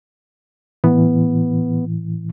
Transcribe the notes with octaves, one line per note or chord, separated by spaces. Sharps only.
A2 E3 B3